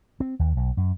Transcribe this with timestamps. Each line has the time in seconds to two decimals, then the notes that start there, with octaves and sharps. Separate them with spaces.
0.20 C4
0.39 D#2
0.57 B1
0.77 F#2